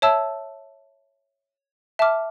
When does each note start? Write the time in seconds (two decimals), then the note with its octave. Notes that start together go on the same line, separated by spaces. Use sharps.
0.02 C#5 E5 A5 E6
1.99 E5 A5 D6 F6